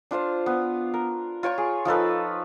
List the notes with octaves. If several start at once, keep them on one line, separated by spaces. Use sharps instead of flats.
D4 F4 C5 F5
B3
A#4
F4 C#5 G5 C#6
G#4
F3 D#4 A4 B4